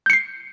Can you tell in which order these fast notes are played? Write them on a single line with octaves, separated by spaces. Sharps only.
G6 C#7 C7